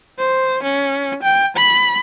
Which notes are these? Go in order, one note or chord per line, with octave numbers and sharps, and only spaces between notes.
C5
C#4
G5
B5